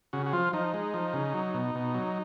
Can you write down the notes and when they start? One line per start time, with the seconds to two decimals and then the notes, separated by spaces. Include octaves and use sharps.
0.13 C#3 F#4
0.26 F#4
0.33 F3 F4
0.53 F3 D#4
0.74 G#3
0.94 F3
1.14 C#3
1.34 F#3
1.54 B2
1.75 B2
1.94 F#3